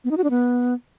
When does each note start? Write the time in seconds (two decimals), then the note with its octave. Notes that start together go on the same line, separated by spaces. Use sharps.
0.04 B3
0.11 D#4
0.17 F#4
0.24 D4
0.30 B3